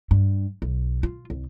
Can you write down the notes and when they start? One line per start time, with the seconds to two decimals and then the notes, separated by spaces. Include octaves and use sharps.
0.11 G2
0.62 B1
1.03 F4
1.30 C2